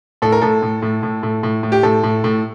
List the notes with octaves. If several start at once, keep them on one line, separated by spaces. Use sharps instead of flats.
A2 A4
A#4
A2 A4
A2
A2
A2
A2
A2
A2
G4
A2 A4
A2
A2